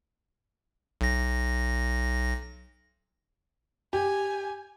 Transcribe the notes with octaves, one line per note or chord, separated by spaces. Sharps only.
B1 A#6
G4 G#5